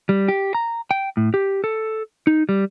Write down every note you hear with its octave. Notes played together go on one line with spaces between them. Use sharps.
G3
G4
A#5
G5
A2
G4
A4
D#4
G3